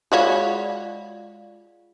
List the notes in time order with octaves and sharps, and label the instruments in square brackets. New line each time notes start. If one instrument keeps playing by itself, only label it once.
[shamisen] G#3 F#4 C#5 [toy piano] F4 D5 F5